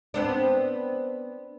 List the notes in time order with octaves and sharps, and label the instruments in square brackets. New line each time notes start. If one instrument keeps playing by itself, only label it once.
[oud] B3 C4 D4